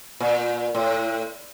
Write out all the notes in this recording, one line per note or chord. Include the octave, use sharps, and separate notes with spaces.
A#2
A2